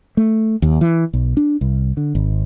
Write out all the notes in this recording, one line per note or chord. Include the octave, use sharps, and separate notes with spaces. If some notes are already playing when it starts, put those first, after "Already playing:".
A3
D#2
E3
B1
D4
C2
D3
G#1